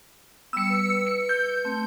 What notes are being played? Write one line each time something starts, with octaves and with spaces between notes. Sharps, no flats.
G3 B3 E6 C#7
B4
C#7
G6
A3 C4